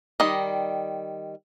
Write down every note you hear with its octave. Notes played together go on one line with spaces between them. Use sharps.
D#3 G3 D#5